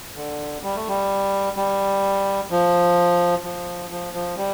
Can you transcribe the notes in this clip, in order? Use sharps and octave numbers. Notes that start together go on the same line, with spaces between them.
D3
G3
A3
G3
G3
F3
F3
F3
F3
G3